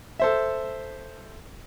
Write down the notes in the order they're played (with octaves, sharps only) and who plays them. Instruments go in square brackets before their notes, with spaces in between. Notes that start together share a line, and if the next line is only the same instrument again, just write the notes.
[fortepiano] A4 C5 E5